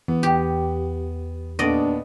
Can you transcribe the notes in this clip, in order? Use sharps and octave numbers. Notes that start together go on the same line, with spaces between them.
E2 B3
G4
D#2 A#2 B3 D4 D5 D#5